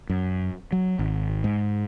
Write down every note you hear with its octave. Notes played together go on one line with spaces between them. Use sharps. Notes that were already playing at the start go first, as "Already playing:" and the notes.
F#2
F#3
G#1
G#2